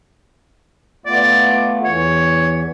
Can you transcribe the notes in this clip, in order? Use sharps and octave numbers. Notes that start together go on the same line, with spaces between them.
A3 B3 F4 D5
E2 E3 C#5